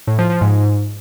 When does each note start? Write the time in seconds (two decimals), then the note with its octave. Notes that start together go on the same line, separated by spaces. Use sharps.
0.07 A2
0.19 F3
0.30 F3
0.41 G#2